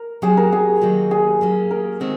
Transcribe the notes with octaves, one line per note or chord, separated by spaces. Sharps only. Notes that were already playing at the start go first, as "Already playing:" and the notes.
Already playing: A#4
F#3 C4 F#4 G#4
A#4
G#4
D#3 F#3 A#3 D#4 F#4
G#4
F#3 A#3 C#4
A#4
D#3 G#3 C4 F#4